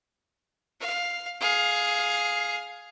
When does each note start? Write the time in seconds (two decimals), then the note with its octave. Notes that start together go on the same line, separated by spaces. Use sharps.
0.80 F5
1.41 G#4 F5